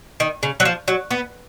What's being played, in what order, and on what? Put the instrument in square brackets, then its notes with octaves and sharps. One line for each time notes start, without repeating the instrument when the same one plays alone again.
[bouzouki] D#3
C#3
F#3
F3
F#3
B3